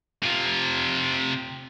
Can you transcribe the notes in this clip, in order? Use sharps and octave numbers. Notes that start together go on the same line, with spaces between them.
C3 F4